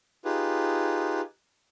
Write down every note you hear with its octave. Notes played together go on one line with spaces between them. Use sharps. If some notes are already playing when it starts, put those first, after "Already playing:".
D#4 F4 G4 G#4 B4